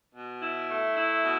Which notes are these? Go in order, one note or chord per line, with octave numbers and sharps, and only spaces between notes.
B2
E4
A3
E4
B2